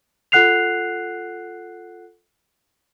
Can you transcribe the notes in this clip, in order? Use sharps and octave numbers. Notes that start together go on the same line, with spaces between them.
F4 A4 F#5 F#6 C7 F7